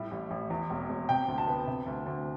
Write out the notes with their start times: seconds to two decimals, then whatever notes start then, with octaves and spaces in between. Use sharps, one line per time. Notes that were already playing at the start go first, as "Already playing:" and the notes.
Already playing: A2 G3
0.11 A1
0.31 A1
0.50 E2
0.70 E1
0.89 E1
1.09 C3 G5
1.28 D2
1.38 A5
1.48 B3
1.68 C3
1.86 D2
2.06 D2